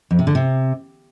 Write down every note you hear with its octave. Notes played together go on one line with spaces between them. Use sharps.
F2
C3
D3
C3